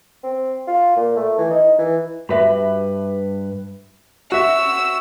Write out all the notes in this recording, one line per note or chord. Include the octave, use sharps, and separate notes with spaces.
C4
F4
A#2
A3
E3
D#4
E3
G2 F#4 B4 E5
F#4 E5 E6